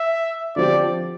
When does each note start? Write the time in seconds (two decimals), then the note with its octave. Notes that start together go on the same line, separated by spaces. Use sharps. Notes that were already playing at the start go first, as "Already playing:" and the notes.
Already playing: E5
0.56 D3 F3 C4 G4 D5